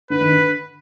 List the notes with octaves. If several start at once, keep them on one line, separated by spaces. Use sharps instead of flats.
D3 B4
D#3
D3